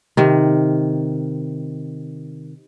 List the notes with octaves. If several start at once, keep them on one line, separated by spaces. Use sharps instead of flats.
C3 D#3